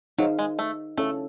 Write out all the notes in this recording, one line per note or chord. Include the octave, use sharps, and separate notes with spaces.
F#3 D#4 G#4 C5 F5
G#3
A3
A3 C#4 E4 A4 C#5 F5